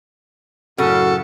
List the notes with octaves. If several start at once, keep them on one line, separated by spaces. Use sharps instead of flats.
F#2 A2 C#3 F#4 A4